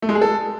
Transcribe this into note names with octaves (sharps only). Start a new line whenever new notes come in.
A3
G#3
G#4
A4